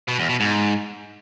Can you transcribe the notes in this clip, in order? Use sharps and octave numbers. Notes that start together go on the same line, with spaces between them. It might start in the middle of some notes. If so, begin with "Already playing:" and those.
B2
E2
B2
G#2